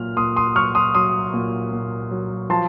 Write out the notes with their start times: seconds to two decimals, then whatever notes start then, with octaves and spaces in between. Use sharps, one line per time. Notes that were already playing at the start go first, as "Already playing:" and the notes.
Already playing: A#2 F#3 F6
0.17 A#2 C6 D#6
0.36 C6 D#6
0.55 F#3 C#6 F6
0.75 C6 D#6
0.95 F#3 C6 D#6
1.34 A#2
1.72 A#2
2.11 F#3
2.50 F3 A5 C6